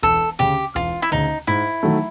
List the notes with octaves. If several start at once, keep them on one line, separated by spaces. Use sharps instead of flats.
E1 A4
D2 C#3 G4
E1 F4
E4
D2 C#3 D#4
G#2 E4
D#3 F#3 A3